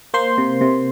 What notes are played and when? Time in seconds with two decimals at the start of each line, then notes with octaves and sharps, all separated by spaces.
0.14 A#3 C5 C6
0.38 C3
0.61 C3